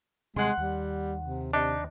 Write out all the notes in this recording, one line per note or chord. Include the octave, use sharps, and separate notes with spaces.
D#2 C3 G3 G#3 F#5 C6
D#2 G3
C3
C3 D4 D#4